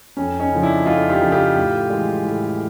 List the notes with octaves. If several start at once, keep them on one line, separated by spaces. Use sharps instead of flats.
F2 C#4
C#4 D#4
C#3 F3
D4 E4
F2 D#4 F4
F4 G4
C#3 F3
F4 G4
A2
E3 G#3
A2